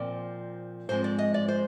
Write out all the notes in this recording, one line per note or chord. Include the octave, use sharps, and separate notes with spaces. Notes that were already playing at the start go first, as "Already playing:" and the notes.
Already playing: A#2 F3 C4 D5
G#2 F3 G#3 C4 C5
D5
D#5
D5
C5